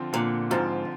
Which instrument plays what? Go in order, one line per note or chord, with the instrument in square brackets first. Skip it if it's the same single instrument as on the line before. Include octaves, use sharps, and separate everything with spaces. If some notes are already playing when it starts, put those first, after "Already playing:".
Already playing: [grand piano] D3 F3 C4 F4
[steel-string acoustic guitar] A#2 [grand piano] D3
[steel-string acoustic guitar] G#2 [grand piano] F3 C4 F4